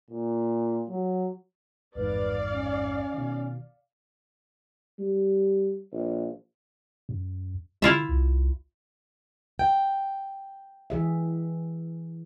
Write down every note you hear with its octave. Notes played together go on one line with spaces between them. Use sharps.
A#2
F#3
A1 F2 G#2 B4 D5 F5
C#4
B2 D#3
G3
A#1
F#2
D3 E4 F4 E5
C2
G5
E3 G#4 E5